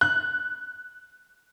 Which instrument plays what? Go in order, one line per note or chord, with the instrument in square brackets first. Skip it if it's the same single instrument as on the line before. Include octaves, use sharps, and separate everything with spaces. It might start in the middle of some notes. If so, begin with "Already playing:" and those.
[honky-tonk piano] F#6